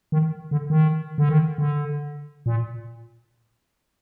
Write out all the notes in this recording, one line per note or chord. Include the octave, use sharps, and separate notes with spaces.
D#3
D3
D#3
D3
D#3
D3
A#2